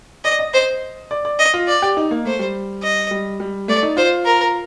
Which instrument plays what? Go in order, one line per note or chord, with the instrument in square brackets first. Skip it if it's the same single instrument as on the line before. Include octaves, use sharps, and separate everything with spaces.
[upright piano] D5 [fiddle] D#5
[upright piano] D#5
[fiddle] C5
[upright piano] D5
D5
[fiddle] D#5
[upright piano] F4
[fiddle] D5
[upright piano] G4
D#4
A#3
[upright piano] A3 [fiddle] C5
[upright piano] G3
[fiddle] D#5
[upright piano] G3
G3
[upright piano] A3 [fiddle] D5
[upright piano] D#4
[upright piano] F4 [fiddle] C5
[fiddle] A#4